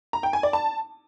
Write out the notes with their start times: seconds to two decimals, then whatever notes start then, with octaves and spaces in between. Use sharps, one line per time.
0.13 A#5
0.23 G5
0.33 G#5
0.43 D5
0.53 A5